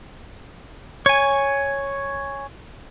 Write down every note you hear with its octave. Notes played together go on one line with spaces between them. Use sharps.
C#5 G#5